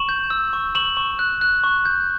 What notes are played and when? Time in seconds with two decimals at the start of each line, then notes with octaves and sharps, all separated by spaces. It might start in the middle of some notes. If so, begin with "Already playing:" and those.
Already playing: C#6 E7 F#7
0.09 G6
0.30 E6
0.53 C#6
0.75 C#6 E7 F#7
0.97 C#6
1.19 F#6
1.41 F#6
1.64 C#6
1.85 G6